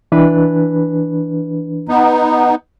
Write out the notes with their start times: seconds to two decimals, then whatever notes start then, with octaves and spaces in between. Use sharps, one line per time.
0.12 E3 D4 B4
1.89 B3 D#4